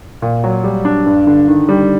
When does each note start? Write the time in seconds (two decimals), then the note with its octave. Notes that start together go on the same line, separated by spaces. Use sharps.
0.22 A#2
0.44 F#3
0.64 G3
0.85 D4
1.06 G2
1.27 D3
1.48 D#3
1.69 G3